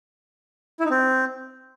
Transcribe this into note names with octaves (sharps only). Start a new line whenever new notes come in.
E4
D#4
C4